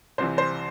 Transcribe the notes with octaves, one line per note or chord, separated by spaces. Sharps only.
C2 C3 E3 C5
C5